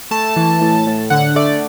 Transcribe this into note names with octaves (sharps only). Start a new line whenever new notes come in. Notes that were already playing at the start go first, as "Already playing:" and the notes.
A3 A5
E3
A2
A2
D3 F#5
A3 D5